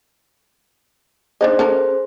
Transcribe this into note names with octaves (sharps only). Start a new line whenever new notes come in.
D4 D#4 G#4 C5 D#5
C#4 A4 A#4